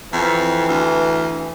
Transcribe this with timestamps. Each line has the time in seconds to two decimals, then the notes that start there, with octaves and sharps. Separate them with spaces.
0.13 F2 E3
0.69 D2